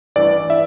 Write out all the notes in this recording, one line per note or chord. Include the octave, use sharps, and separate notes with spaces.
A1 G2 E3 D5
E3 E5